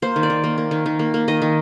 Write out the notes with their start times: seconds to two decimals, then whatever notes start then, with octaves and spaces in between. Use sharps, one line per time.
0.02 A#3 C5
0.16 D#3
0.23 D5
0.30 D#3
0.44 A#3
0.58 A#3
0.71 D#3
0.86 D#3
0.99 A#3
1.14 A#3
1.28 D#3 D#5
1.42 D#3